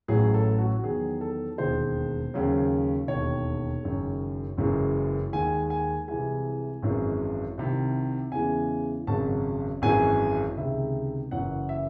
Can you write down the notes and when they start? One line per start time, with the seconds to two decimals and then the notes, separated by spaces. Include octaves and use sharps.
0.08 A1 A2 F#3 G#4
0.34 A4
0.58 F#4
0.83 E2 D#3 F#3 G#4
1.21 A4
1.58 E1 D#2 D#3 G#3 C5
2.34 D#2 C#3 F#3
3.08 E1 D#2 D#3 C#5
3.82 F#1 F#2 D#3 G#3
4.57 F#1 F#2 E3 G#3
5.33 D#2 D#3 G#3 G#5
5.70 G#5
6.08 C2 C3 E3 G#3 G#5
6.82 G#1 F#2 E3 G#3
7.58 C2 C3 D#3
8.32 E2 C#3 E3 G#3 G#5
9.07 G#1 F#2 C#3 F#3 A5
9.82 G#1 F#2 E3 G#3 G#5
10.57 C#2 C3 D#3 G#3 E5
11.31 F#1 F#2 E3 F#5
11.69 E5